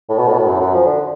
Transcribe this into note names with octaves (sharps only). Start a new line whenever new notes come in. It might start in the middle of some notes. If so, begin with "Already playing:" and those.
A2
B2
A2
B2
A2
F#2
F#2
F3
D3